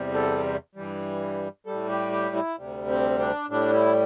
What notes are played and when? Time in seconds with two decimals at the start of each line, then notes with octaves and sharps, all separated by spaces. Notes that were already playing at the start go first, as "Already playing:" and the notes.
Already playing: E2 C3 G3
0.14 A4
0.75 G2 E3 G3
1.66 A2 G3 A4
1.89 G4
2.12 G4
2.36 E4
2.58 D2 C3 G3
2.89 C4
3.20 D4
3.49 A2 G3 D4
3.72 E4